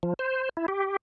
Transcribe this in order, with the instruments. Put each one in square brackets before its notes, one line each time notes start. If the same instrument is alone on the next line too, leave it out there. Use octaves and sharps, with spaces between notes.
[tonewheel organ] F3
C5
E4
G4